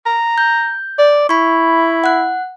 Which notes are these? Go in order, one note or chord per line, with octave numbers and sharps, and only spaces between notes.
A#5
G6
D5
E4 B5 C#6
F#5 F#6